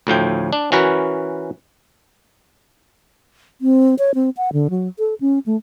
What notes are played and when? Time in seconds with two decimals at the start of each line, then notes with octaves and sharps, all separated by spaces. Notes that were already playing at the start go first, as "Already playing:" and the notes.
0.07 D2 A2 F3 G5
0.53 D4
0.72 E3 C#4 F#4 A#4 B4 F#5
3.61 C4
3.99 C#5
4.15 C4
4.37 F#5
4.53 D3
4.70 F#3
4.99 A4
5.21 C#4
5.46 A3